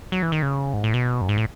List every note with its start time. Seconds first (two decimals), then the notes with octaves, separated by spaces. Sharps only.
0.12 F#3
0.23 E3
0.32 D#3
0.42 C#3
0.73 G#2
0.84 A2
0.94 B2
1.21 F#2
1.29 G#2
1.38 A2